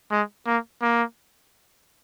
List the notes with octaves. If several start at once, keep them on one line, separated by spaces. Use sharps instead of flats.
G#3
A#3
A#3